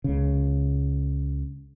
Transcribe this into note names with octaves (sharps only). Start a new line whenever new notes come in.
C#2 C#3